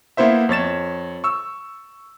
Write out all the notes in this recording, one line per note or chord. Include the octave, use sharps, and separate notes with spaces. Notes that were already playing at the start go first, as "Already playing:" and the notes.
A#3 B3 E4 C5 E5
F2 C#5 A6 E7
C#6 E6